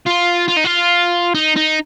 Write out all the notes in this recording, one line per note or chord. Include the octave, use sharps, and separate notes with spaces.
F4
F4
D#4
F4
D#4
D#4